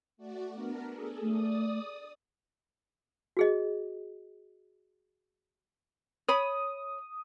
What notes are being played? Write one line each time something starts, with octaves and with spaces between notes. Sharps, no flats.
A3 F#4 D5
B3 D4 A#4
G#4 A4
A3 D5 D#6
F#4 G#4 D#5
C#5 B5 D#6